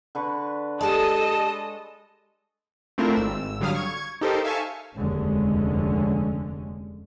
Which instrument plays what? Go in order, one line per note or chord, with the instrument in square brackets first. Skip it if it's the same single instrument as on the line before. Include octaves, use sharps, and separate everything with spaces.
[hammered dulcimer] D3 B4 C#6
[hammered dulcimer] G#3 [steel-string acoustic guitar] G4 D5 [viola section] A4 D#5 [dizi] A5
[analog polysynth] A3 C4 D4 E4 F4 A#4
G#1 E6
D3 F#3 G3 F5 D#6 F6
C#6 G#6
D#4 G4 A4 A#4 C5
E5 F5 G#5 A5 C#6
[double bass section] F1 D#2 D3 G#3 C#4